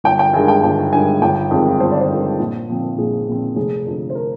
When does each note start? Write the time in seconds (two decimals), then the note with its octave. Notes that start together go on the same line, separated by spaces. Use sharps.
0.04 G1 G5
0.19 G5
0.33 G2 D#3 G#3 G#5
0.48 G5
0.63 G1 G5
0.92 G2 D#3 G#3 G#5
1.22 G1 G5
1.51 F2 D#3 G#3 C4
1.80 G1 C5
1.92 D5
2.01 C5
2.10 F2 D#3 G#3 C4
2.39 A#1
2.69 A#2 F3 C4
2.98 A#1 G#4
3.27 A#2 F3 C4
3.56 F1 G#4
3.87 F2 D3
4.10 C5
4.15 A#4